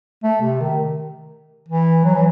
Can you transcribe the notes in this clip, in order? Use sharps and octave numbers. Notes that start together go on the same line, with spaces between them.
A3
C3
D#3
E3
F#3
E3